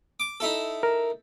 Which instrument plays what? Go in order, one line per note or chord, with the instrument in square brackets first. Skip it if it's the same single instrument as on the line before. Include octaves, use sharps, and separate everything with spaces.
[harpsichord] D6
D#4 E4 A4
[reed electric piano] A#4